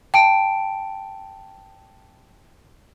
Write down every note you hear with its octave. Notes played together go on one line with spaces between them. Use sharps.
G5 A5 D7